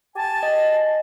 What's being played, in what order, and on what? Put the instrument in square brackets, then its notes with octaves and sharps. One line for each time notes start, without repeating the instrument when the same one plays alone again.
[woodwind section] G4 G#5 A5
[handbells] D#5